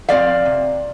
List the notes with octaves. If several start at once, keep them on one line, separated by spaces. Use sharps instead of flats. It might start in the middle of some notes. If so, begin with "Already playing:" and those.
F3 C4 D5 F5
C3